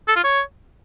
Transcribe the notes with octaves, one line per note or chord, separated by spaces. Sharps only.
A4
F4
C#5